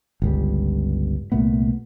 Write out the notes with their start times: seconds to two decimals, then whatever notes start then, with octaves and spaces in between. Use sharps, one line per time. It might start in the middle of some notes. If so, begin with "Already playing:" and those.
0.22 G1 C#2 G3
1.32 C2 A#2 A3 B3